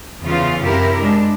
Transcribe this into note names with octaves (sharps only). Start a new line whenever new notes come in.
E2 C#3 E3 F4
F#2 C3 E4 G4 A#4
G#3 D4